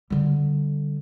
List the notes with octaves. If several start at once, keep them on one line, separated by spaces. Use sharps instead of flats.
D3 G3